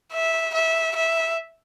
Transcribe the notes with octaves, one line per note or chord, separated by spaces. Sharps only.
E5
E5
E5